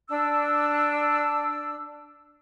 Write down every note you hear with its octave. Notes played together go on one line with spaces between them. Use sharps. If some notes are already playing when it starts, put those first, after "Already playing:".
D4 E6